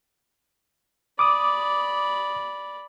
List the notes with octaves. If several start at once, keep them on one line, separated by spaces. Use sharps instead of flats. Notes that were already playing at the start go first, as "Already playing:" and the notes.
D5 B5 D6 D#6